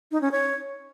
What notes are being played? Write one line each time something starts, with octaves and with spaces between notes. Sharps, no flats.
D#4
C#4
C#5